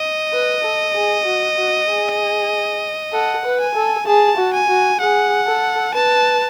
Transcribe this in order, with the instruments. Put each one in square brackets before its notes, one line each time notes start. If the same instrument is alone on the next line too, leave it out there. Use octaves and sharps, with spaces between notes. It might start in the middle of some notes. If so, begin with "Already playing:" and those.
Already playing: [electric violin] D#5
[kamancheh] B4
A4
G#4
F#4
F#4
G#4
[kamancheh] A4 [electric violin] F#5
[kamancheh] B4
[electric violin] G#5
[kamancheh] A4
[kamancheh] G#4 [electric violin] A5
[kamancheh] F#4
[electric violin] G#5
[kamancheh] F#4
[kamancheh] G#4 [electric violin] F#5
[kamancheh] A4
[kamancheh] B4 [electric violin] A5